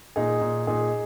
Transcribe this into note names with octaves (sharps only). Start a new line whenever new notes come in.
A#2 D#4 G#4
A#2
A#2 D#4 G#4